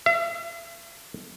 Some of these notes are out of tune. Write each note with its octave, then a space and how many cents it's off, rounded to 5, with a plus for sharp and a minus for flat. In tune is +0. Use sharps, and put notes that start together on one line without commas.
E5 +45